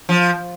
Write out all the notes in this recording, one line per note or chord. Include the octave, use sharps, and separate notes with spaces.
F3